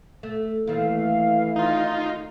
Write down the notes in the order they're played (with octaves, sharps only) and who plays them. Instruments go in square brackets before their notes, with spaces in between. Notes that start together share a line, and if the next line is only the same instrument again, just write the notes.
[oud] A3
[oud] D#2 A3 [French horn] E3 [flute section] F5
[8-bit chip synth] D#4 F4